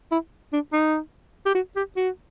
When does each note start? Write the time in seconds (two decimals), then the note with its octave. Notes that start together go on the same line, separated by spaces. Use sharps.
0.12 E4
0.53 D4
0.73 D#4
1.46 G4
1.55 F#4
1.76 G4
1.97 F#4